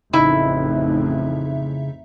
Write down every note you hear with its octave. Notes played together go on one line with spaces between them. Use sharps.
A1 F2 C#3 D#4 E4 E5